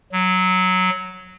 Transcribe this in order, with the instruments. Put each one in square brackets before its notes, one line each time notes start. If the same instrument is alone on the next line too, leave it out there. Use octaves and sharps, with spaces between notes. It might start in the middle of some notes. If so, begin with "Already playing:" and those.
[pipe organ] F#3